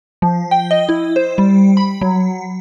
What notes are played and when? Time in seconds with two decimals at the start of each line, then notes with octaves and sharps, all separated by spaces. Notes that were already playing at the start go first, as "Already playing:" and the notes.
0.22 F3
0.51 G5
0.71 D#5
0.89 E4
1.16 C5
1.38 G3
1.77 B5
2.01 F#3